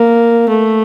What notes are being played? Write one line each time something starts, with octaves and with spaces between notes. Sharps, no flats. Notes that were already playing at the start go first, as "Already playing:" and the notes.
Already playing: A#3
A3